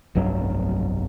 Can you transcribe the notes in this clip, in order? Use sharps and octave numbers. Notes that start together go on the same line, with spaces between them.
F1 B1 G2 F#3